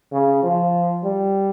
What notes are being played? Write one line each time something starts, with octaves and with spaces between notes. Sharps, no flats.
C#3
F3
G3